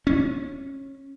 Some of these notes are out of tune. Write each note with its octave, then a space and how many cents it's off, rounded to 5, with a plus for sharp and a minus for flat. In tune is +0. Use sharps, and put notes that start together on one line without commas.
C#4 -20